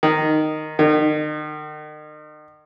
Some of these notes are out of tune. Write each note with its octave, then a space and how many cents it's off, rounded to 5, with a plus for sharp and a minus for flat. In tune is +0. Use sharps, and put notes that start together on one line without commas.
D#3 -10
D#3 -40